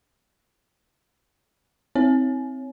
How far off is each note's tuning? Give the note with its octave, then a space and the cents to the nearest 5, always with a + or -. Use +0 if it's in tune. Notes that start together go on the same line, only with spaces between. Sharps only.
C4 +0 C#5 +0